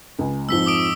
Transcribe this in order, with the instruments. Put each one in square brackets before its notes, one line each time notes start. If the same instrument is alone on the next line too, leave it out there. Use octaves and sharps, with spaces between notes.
[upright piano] C#2 G#5
[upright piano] F2 G#2 F3 [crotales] E6 B6 G7
[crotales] D6 D#6 D7